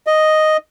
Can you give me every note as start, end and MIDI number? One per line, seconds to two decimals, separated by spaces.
0.07 0.57 75